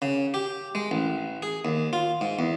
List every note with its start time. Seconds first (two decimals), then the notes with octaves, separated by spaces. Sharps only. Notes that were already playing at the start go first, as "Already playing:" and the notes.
0.02 C#3
0.34 G4
0.75 G#3
0.91 A1
1.42 G#4
1.65 D#2
1.93 F4
2.21 G#2
2.39 E2